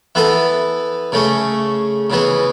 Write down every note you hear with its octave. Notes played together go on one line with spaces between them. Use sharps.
E3 B3 E4 A4
C#3 A3 C#4
C#3 E3 B3